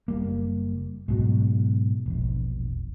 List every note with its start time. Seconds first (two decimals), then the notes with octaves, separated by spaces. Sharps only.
0.08 F#1 G3 A#3
1.08 G#2 B2 F#3
2.06 E1 A#1